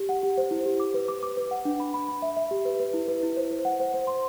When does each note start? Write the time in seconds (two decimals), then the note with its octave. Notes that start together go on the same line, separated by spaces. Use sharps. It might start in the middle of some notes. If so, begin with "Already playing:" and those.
Already playing: G4
0.09 F#5
0.23 G4
0.37 C5
0.51 E4
0.66 G4
0.80 D6
0.94 B4
1.08 D6
1.23 D6
1.37 B4
1.51 F#5
1.65 D4
1.80 B5
1.94 B5
2.08 B5
2.22 E5
2.37 E5
2.51 G4
2.65 B4
2.80 B4
2.94 E4
3.08 B4
3.23 E4
3.37 C5
3.51 C5
3.65 F#5
3.80 C5
3.94 C5
4.07 C6